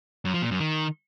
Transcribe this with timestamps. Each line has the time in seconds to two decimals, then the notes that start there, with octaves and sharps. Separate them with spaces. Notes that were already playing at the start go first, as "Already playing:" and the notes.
0.25 F#2
0.34 F3
0.42 A#2
0.51 F#2
0.60 D#3